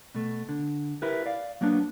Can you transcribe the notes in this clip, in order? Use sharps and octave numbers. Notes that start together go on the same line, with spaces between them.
B2 A3
D3
E4 G4 A#4 B4
D5 F5
F#3 A#3 B3 D4